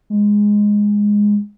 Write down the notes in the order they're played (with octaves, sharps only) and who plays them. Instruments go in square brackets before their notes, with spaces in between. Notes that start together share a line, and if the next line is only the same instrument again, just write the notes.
[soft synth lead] G#3